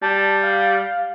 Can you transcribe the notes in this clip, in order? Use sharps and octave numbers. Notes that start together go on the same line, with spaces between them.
G3 A5
F5